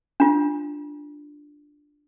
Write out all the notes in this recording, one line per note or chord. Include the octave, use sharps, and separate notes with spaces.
D4 F4